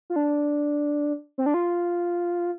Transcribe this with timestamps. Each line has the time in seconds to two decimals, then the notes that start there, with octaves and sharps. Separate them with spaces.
0.10 F4
0.16 D4
1.38 C4
1.46 D4
1.54 F4